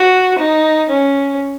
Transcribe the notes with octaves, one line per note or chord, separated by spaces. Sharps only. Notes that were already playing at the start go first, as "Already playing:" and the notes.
Already playing: F#4
D#4
C#4